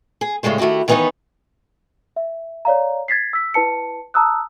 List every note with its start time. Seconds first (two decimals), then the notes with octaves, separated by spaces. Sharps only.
0.21 G#4
0.43 A2 C#3 G3 G#3 C5
0.58 D#3 A3 E4 F#4 G4
0.88 D#3 E3 B3 D#4 B4 C#5
2.16 E5
2.65 C#5 D5 F5 A#5
3.08 G#6 A6 B6 C7
3.33 E6 B6
3.54 E4 B4 A5 C#7
4.14 A5 A#5 D#6 E6 F#6